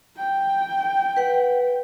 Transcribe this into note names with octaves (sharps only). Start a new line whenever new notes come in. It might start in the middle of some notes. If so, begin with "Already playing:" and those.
G5
B4 F#5